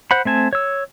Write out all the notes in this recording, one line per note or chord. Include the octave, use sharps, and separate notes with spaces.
C5 F#5 B5
A3 C4 G#5 A5
C#5 E6